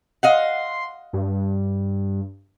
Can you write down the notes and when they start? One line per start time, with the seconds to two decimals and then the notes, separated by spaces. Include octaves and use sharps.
0.23 D#5 F5 F#5 C6
1.13 G2